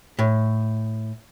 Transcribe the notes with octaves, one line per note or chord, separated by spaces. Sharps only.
A2